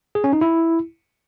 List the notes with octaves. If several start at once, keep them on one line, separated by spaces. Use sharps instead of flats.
G#4
C#4
D#4
E4